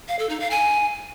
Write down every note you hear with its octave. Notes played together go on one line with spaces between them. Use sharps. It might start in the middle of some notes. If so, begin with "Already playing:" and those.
F5
A4
D#4
F5
G#5